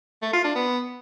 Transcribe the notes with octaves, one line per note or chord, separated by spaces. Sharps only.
A3
F4
D4
B3